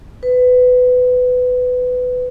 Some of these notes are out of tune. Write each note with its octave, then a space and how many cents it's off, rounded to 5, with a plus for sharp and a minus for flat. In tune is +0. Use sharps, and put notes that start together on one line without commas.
B4 +20